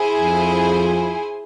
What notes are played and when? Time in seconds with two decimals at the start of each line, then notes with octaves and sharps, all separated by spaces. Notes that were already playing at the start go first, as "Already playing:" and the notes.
Already playing: E4 G#4 C5 G#5
0.19 F2 F3